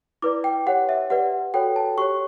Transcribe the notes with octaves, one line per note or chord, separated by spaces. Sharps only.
E4 B4 D5 D6
G5
G4 C#5 F#5
E5
G4 B4 D5 F#5
F#4 A4 C#5 G5
A5
G4 C#5 C#6